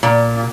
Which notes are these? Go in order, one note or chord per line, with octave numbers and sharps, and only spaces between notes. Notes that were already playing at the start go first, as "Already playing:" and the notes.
A#2